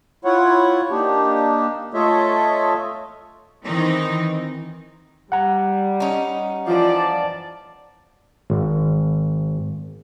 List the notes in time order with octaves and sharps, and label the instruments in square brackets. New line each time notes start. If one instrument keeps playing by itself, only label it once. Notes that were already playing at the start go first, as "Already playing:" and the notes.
[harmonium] E4 F4 C#5 F#5
A#3 D4 D#4 G4
A3 F4 A4 C#5 D#5 E5
[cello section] D#3 E3 C4 D#4
[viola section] G3 [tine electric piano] F#5 A#5
[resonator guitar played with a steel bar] C#4 D#4
[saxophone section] E3 F3 [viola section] D5 A5
[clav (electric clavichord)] G#1